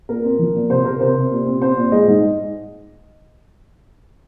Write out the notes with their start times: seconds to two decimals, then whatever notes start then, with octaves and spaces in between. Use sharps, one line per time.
0.09 A#2 A#4
0.24 C4
0.39 F3
0.55 A#2
0.70 C3 C5
0.85 C3 A#4
1.00 C3 C5
1.16 C3
1.31 A#2
1.46 C4
1.62 C4 C5
1.77 A#2
1.92 G#3 D#5
2.07 G#2